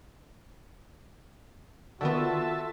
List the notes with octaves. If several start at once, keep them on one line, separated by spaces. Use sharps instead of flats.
D3 D#3 B3 F4 F#4 A4 E5 A5